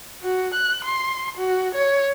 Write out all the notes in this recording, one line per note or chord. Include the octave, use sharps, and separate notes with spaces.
F#4
F#6
C6
F#4
C#5